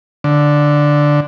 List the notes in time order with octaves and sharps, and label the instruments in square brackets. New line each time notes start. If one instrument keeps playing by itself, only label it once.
[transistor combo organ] D3